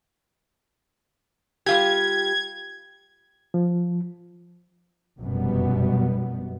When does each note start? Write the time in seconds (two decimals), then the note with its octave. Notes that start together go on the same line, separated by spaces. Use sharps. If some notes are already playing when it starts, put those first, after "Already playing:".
1.66 G3 F4 G4 G#6
3.54 F3
5.20 F1 F#2 B2 G3 B3